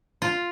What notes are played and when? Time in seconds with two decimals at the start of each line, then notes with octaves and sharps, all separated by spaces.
0.22 F4